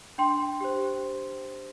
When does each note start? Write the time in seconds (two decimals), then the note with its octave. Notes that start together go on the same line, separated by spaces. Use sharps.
0.18 D4 G5 C6
0.61 G4 C5